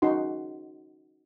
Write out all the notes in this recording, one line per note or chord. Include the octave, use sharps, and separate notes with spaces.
C#4 D#4 F#4 C6